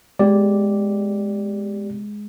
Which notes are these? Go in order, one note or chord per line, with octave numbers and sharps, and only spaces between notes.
G#3 B3 G4 D5